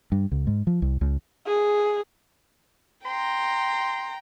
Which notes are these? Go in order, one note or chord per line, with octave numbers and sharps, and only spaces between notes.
G2
C#2
G#2
F3
C2
C#2
G#4
G5 A#5 C6